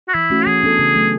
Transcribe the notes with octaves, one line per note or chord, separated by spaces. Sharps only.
F#4
E3 E4
A3 C#4 F#4
E3 G#4
B3 D4 A4
C#3
F#3 A3